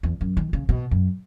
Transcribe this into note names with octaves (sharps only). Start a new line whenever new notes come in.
E2
F#2
D#3
C#3
B2
F#2